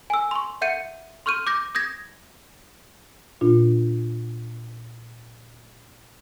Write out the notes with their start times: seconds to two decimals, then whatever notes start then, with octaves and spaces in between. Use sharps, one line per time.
0.10 G#5 E6
0.31 C6 C#6
0.61 E5 F#5 G6 C#7 D#7
1.26 C6 C#6 F6 G6 D#7
1.47 D6 G6 A#6
1.75 D#6 G6 G#6 A#6
3.41 A#2 D4 F4